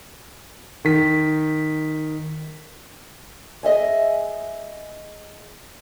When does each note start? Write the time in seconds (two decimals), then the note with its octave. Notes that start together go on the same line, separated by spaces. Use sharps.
0.85 D#3 B6
3.63 G#4 D#5 E5 G#5